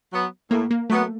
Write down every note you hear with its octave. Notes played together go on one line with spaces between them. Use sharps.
F#3 B3
A2 A#3
A#3
F#3 A3 B3